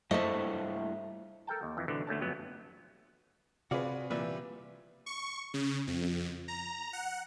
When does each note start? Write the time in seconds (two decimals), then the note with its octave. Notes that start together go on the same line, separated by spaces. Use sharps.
0.11 G2 F3 A3 C4 E4 D#5 E5
1.47 A4 A#4 G5 A5
1.63 D#2
1.77 F2 E3
1.88 C2 B2 D3 E3
2.07 D2 A3 C#4 A5
2.21 G1 F2 F#3 B3
3.71 C3 F4 F#4 G#4 B4 D5
4.10 A#2 E3 G3 B4 D5 E5
5.06 C#6
5.54 C#3
5.87 F2
6.48 A#5
6.93 F#5